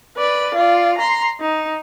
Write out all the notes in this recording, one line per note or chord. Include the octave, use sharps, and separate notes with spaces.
B4 D5
F4 D5
A#5 C6
D#4